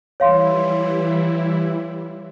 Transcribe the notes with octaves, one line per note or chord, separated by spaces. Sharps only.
E3 G3 E4 C#5 F5 C6